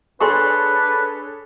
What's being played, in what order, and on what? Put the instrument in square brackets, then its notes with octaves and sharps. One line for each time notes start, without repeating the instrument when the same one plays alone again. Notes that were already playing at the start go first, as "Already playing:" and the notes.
[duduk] D4 [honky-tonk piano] G#4 A4 C#5 [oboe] B4 [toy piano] G#5 C6 C#6